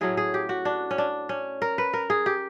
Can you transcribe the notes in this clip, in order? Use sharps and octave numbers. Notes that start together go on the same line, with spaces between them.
A2 F#3 A3 C#4 G#4
G#4
G4
F#4
D4
C#4
D4
C#4
A#4
B4
A#4
G#4
G4